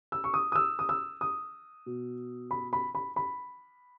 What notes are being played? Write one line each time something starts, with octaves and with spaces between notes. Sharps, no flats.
E6
C#6
D#6
D#6
E6
D#6
E6
D#6
B2
B5
B5
B5
B5